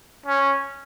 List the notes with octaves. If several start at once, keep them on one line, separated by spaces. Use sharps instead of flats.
C#4